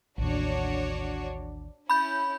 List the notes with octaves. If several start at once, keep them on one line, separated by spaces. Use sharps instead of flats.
A1 D#2 D4 F#4 C#5
C#4 E4 B5 G6